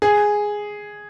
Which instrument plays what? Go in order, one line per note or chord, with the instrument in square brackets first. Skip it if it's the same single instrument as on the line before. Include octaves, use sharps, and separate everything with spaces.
[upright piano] G#4